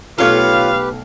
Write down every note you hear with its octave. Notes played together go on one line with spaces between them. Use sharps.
B1 A3 F4 G4 A4 B4 C#5 F5